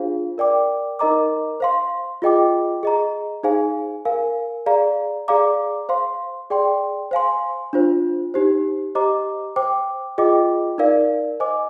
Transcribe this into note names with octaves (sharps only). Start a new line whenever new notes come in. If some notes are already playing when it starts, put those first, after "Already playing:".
Already playing: D4 F4 G#4 C5 F5
A#4 D5 G5 D6
D#4 A#4 D#5 A#5 D6
C5 F5 C6
F4 G#4 D#5 G5 D6
G#4 D#5 A#5
D#4 G#4 C5 F5 G#5
A#4 F5 G#5
G#4 D5 F5 A#5
G#4 D5 F5 A#5 D6
C5 F5 C6
G#4 D5 G5 C6
C5 F5 G#5 C6
D4 F4 C5
D#4 G4 C5
G4 C5 D#5 A#5 D6
C5 G5 D6
F4 G#4 D#5 G5 D6
D#4 A#4 D5 F5
C5 D#5 G#5 D6